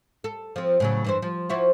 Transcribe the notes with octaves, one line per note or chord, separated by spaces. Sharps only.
A4
F3 C4
A2 C#3 F#3
G2 E3 C5
F3
F3 E4 F#4